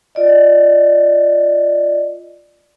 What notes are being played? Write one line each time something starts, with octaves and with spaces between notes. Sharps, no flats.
F4 D5 D#5